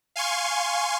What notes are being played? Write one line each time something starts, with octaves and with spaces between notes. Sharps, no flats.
F5 G#5 C6 C#6